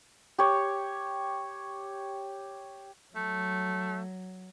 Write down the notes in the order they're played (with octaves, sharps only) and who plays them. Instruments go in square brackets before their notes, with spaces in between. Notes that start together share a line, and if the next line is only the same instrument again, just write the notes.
[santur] G4 C#5
[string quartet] F#3 [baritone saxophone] A3